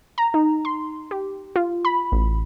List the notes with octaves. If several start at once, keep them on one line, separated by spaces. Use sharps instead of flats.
A#5
D#4
C6
G4
F4
B5
A1